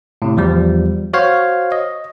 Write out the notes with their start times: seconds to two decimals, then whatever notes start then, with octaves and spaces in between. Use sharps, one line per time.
0.22 A2 C3
0.37 E2 F3 G3
1.13 F#4 C5 C#5 F5
1.72 D#5